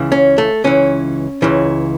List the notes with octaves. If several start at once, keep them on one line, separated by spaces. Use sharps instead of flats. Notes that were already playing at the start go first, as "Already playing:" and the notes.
Already playing: C#2 C#3 E3
C#4
A3
C#2 C#3 E3 C#4
C#2 C#3 E3